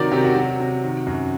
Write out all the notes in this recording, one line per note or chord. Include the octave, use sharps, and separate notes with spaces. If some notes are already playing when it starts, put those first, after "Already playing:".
Already playing: C3 D#3 F#3 A#4 D5
C3 G4 A#4
F#4
F#3
C3
D#3
F#2